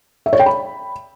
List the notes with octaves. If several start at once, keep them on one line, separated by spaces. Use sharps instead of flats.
E5
C#5
G5
B5